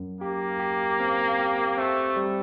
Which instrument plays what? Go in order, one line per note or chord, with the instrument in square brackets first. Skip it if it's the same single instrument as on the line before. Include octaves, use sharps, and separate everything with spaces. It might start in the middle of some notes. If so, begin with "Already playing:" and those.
Already playing: [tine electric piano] F#2
[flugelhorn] A#3 [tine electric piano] G4
[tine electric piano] G4
C4
G4
[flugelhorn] A3 [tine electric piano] C4
[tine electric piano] G3